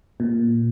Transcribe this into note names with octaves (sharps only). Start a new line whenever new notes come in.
A#2